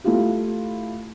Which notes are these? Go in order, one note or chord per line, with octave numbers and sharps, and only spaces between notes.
A3 E4 F4 G4